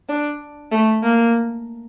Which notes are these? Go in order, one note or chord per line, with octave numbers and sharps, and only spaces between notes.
D4
A3
A#3